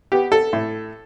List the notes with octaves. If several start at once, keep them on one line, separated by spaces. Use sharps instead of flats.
B3 G4
A4
A2